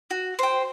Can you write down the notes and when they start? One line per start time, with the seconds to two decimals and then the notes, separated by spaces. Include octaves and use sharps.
0.11 F#4
0.39 C5 G5